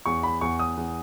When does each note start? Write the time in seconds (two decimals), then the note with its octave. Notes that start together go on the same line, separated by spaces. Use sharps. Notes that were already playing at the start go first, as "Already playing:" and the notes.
0.06 E2 C#6
0.23 B5
0.41 E2 C#6
0.59 D#6
0.77 E2